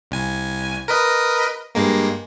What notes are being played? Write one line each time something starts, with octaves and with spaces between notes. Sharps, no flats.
C2 G#5
A#4 B4 D#5
G2 G#3 A#3